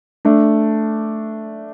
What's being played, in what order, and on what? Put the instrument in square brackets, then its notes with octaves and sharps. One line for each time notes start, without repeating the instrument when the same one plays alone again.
[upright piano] A3 D4